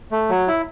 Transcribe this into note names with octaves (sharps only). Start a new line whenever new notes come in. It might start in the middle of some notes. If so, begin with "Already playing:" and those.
A3
F#3
E4